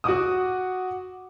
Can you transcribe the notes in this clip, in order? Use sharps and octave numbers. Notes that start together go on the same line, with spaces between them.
F#4 F#5 D6 D#6